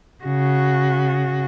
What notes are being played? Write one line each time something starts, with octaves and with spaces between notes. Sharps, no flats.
C#3 F#4